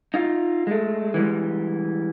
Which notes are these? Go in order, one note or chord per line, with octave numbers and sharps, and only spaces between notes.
D#4 F4
G#3 A3
E3 G3 G#3